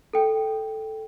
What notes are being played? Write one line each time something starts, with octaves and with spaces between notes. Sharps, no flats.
A4 G5